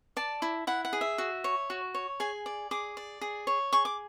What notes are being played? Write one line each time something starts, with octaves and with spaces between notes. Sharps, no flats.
D5 A5
E4
E4 F#5
F#5
G#4
E5
F#4
C#5
F#4
C#5
G#4 G#5
D5
G#4 D6
D5
G#4
C#5
G#4 C#6
D6